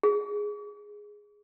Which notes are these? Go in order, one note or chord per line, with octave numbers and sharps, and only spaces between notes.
G#4